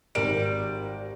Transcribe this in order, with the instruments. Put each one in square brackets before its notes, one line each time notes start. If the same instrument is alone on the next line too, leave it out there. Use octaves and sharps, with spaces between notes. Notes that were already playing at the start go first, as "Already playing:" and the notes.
[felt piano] G#1 A#4 D7 [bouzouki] G3